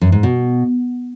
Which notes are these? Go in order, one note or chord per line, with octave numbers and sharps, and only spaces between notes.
F#2
G#2
B2